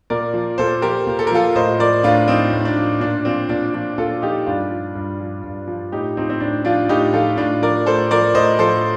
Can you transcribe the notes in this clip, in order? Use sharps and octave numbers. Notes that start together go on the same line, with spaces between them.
A#2 A#4 D5
F3
A#2 A4 C5
F3 G4 A#4
A#2
A4
A#4
F3 F4 A4
A2 C5 D#5
F3 A#4 D5
A2 D4 F4
F3 C4 D#4
A2
D4
F3
A#2 D4
F3 C4
A#2 D4
F3 D4
A#2 F4 A4
F3 D#4 G4
G2 D4 F4
F3
G2
F3
G2
F3
A2 D#4 G4
F3 C4 D#4
C4
A2 D4
F3 D4 F4
A2 D#4 G4
F3 F4 A4
A2 D4 F4
F3 A#4 D5
A2 A4 C5
F3 A#4 D5
A2 C5 D#5
F3 A4 C5